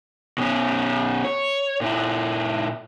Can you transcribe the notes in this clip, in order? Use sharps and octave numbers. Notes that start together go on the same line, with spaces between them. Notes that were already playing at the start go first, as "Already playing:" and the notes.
B2 C#4
C#5
A#2 E4